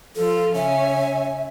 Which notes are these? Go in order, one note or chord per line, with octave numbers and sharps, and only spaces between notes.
F3 F4 A4
C#3 C#4 E5 G#5